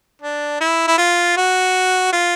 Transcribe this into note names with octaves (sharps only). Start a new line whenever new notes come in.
D4
E4
E4
F4
F#4
F4